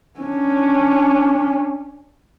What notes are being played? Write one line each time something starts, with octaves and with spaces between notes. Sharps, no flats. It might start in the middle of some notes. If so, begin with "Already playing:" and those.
C#4 D4